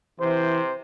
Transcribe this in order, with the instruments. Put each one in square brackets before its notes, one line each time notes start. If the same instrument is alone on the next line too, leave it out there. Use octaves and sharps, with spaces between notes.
[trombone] C3 [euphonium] E3 [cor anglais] C5